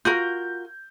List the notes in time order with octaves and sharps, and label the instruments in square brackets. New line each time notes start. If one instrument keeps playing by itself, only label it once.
[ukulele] F4 F#4 A#4 [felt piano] G6